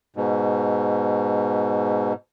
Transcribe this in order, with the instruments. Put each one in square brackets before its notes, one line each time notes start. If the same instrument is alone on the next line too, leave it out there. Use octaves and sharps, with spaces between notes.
[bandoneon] G#2 B2